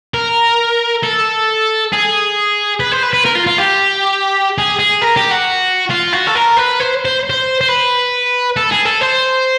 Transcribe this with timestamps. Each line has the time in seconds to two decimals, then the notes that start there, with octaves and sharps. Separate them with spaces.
0.14 A#4
1.04 A4
1.92 G#4
2.80 B4
2.92 C5
3.03 B4
3.13 B4
3.25 A#4
3.35 F4
3.47 F4
3.58 G4
4.58 G#4
4.79 G#4
5.02 A#4
5.17 G4
5.32 F#4
5.90 F4
6.13 F#4
6.27 A4
6.35 A#4
6.57 B4
6.80 C5
7.05 C5
7.30 C5
7.61 C5
7.68 B4
8.56 A4
8.72 G#4
8.85 A4
9.01 C5